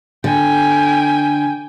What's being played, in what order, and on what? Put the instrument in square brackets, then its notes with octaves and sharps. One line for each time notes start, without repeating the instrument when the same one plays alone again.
[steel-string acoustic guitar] D3 [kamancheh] G5 G#5